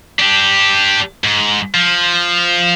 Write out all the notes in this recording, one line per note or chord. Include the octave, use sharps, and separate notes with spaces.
D4 G4
G#2
F3